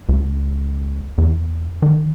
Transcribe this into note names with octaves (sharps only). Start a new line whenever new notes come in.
C#2
E2
D#3